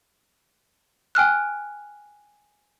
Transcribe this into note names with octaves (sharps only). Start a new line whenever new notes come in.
G5 G#5 F6 F#6